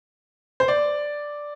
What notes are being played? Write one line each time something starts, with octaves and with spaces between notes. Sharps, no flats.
C5
D5